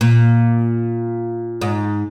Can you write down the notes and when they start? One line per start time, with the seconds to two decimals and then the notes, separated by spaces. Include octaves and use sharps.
0.01 A#2
1.61 G#2